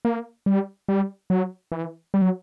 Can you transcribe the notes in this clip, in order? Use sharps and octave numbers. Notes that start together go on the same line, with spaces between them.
A#3
G3
G3
F#3
E3
G3
F#3